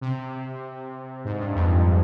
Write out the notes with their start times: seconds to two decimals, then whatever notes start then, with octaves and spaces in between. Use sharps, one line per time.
0.01 C3
1.25 G#2
1.39 G2
1.55 F2